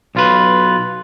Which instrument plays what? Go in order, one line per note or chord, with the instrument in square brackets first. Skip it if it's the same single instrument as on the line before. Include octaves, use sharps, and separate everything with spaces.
[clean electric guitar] B1 F4 B4